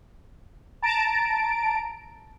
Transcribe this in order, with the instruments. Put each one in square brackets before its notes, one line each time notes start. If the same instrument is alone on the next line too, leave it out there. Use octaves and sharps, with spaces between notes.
[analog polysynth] A5 A#5 D7